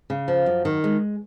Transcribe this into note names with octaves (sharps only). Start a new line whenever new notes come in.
C#3
F3
F#2
D#3
G#3